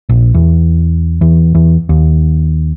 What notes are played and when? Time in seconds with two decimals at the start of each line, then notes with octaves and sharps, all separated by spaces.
0.09 A#1
0.34 E2
1.21 E2
1.55 E2
1.89 D#2